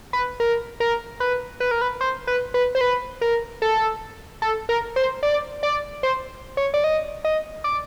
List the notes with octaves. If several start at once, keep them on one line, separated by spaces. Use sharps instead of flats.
B4
A#4
A#4
B4
B4
A#4
B4
C5
B4
B4
C5
B4
A#4
A4
A4
A#4
C5
D5
D5
C5
C#5
D5
D#5
D#5
D5